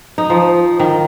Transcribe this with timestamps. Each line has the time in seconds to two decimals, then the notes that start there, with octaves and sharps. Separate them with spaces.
0.18 D#4
0.30 F3
0.80 D#3